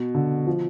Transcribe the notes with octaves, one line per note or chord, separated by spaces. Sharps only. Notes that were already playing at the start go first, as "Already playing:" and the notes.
Already playing: B2
D3
F3